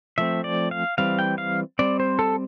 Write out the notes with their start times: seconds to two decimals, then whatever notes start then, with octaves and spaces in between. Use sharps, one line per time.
0.18 F3 A3 C4 E5
0.44 D5
0.71 F5
0.98 E3 G3 C4 F5
1.19 G5
1.38 F5
1.79 G3 C4 D5
2.00 C5
2.19 A4